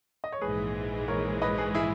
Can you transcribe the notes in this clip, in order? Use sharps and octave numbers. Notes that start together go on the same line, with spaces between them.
D#5
C#5
A#1 G#2 E3 G#3 G#4 B4
A#4 C#5
B4 D#5
G#4 B4
E4 G#4